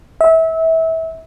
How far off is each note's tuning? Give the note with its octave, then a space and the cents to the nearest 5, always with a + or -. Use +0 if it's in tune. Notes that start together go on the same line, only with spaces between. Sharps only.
E5 -25